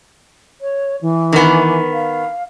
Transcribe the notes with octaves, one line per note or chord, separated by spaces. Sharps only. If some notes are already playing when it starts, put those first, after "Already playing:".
C#5
E3
D#3 B3
F5